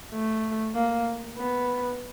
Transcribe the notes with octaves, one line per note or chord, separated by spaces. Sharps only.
A3
A#3
B3